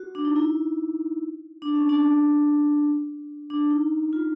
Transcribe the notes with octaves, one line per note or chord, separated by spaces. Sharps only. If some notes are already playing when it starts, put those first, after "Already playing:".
Already playing: F#4
D4
D#4
E4
D4
C#4
D4
D4
D#4
F4